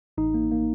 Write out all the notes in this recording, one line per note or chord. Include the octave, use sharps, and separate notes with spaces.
A1 D#4
A#3
A#3